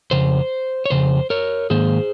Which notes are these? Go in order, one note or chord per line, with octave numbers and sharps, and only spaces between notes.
F2 C#3 C5
C#5
F2 C#3 C5
A#4 C#5
G#2 D#3 A#3 G#4 C5